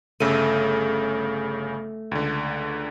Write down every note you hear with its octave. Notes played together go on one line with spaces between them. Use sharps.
G1 C#3 A3 D#7
C#2 D3